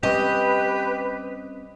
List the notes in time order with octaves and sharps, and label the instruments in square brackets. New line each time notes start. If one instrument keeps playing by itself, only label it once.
[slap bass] G3 C4 C#4 [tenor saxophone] G4 [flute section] B4 [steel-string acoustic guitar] D#5